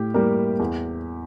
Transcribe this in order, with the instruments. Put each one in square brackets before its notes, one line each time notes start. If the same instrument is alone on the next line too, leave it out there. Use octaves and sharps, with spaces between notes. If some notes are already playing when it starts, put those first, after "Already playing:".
Already playing: [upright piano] A2 G4
G3 A#3
E2